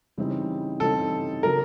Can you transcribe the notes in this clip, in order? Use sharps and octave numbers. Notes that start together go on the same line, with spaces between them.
C#3 E3 G3 C4 D#4
C#3 E3 G3 C4 D#4 A4
C#3 F#3 A#4